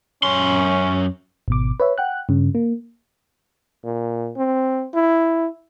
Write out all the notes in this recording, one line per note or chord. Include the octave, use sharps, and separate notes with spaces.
F#2 C#4 C6
G#1 B2 D6
B4 C#5 E5
F#5 G5 F#6
G2 C#3
A#3
A#2
C4
E4